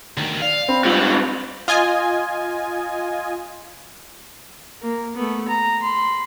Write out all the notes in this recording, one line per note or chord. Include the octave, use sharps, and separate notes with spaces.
D2 D#3
D5 F5
C4 B5
G#2 G3 F4 C#5 F#5
F4 D#5 G#5
A#3
A3 B3
A#5
B5 C6